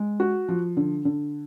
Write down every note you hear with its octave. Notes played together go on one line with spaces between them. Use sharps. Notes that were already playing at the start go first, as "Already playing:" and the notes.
Already playing: G#3
F#4
F3
D3
D3